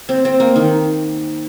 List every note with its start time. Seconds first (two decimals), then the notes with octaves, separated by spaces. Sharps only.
0.09 C4
0.25 C4
0.40 A#3
0.56 D#3